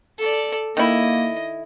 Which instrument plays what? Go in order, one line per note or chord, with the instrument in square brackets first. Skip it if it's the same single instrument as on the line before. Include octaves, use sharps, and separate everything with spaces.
[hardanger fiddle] A4 D5
[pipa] D#3 E4 [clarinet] A#3 [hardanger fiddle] D#5